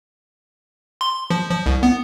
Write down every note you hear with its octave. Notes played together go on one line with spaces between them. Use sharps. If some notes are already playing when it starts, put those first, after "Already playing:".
C6
F3
F3
C2
B3